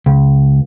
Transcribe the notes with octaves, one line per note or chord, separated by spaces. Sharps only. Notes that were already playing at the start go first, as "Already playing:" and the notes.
C#2